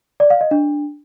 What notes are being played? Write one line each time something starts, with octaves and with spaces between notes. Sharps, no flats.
D5
F5
D#5
D4